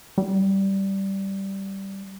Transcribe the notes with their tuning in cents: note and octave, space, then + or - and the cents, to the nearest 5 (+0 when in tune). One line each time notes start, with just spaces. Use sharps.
G3 -10